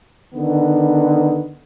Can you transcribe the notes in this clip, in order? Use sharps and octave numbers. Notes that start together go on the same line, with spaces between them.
D3 D#3 B3